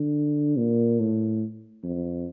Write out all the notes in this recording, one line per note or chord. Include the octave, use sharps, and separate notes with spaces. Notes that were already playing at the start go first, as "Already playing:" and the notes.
Already playing: D3
A#2
A2
F2